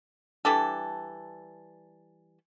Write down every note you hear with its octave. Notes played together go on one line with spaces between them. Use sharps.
E3 G3 D4 A4